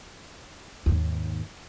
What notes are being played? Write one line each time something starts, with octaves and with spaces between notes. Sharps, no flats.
D#2 G#2